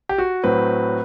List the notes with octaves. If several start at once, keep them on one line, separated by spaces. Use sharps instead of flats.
G4
F#4
A2 F#3 C4 B4